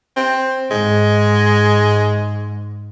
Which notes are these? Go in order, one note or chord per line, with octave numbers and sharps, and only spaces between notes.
C4
G#2 G#3